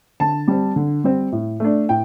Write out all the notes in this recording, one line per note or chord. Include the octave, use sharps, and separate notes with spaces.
D3 A5
G3 C4
D3
G3 C4
A2
A3 D4
A2 G5